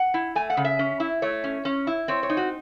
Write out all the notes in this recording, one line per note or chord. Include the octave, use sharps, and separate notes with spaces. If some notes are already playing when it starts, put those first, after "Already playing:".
Already playing: F#5
E4
A3 G#5
F#5
C#3
E5
C#4
E4
A3 C#5
C#4
C#4
E4
C4 C#5
C#5
D#4
F#4